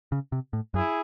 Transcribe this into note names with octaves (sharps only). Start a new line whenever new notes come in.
C#3
C3
A2
F#2 E4 G#4